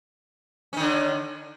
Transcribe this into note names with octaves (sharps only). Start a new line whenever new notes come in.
D3 D#3 C#4